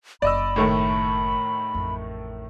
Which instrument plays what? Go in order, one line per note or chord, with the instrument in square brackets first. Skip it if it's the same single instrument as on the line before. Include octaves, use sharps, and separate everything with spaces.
[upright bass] F#1 [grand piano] D5 D#5 E6 [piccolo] B5
[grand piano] A2 D#3 A3
[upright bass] A1 F2